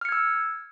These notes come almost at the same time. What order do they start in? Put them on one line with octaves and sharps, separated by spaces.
F6 C#7 G#6 E6